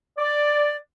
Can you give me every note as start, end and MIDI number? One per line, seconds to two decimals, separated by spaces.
0.18 0.76 74